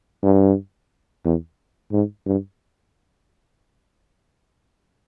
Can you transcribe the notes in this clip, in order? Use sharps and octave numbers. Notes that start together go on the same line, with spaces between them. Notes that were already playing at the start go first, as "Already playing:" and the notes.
G2
E2
G#2
G2